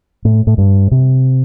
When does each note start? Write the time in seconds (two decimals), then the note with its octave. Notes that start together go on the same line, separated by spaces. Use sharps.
0.25 A2
0.47 A2
0.58 G2
0.91 C3